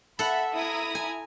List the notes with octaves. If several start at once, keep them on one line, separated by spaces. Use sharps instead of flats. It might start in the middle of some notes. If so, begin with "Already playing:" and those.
A4 E5 F#5 B5
E4 A#5 D#6
G#5